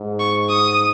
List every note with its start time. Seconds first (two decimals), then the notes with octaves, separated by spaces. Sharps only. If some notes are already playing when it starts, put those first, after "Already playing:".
Already playing: G#2
0.20 C#6
0.50 D#6